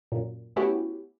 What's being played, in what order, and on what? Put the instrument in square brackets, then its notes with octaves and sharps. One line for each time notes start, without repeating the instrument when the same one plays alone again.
[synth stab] F#2 A#2
A3 B3 C#4 E4 F#4 G4